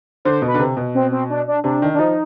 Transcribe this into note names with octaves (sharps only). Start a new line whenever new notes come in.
D3 C5
B2
B4
D3
C3
B2
C4
C4
D4
D4
C3 D4
D#3
D4
F3 D#4